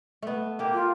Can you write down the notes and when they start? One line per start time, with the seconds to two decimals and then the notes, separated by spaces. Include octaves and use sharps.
0.22 A3 B3
0.59 A#3 G4
0.73 F4